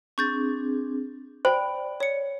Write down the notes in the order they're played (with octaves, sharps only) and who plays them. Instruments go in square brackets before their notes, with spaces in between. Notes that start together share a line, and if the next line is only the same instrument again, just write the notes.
[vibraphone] C4 D4 G#4 [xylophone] C#6 G6 A6
[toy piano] C5 [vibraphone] D5 [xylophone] G5 B5
[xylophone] C#5 C#7